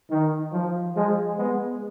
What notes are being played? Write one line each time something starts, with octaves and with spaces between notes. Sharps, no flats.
D#3
F3
F3 G#3
G#3 B3